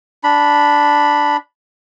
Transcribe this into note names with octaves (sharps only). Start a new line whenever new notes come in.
D4 B5